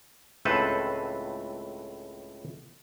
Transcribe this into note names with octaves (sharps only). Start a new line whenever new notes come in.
C#2 A2 C4 A4 B4 C5